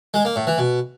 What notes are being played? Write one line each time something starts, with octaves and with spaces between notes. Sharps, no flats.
G#3
A#3
A2
E3
B2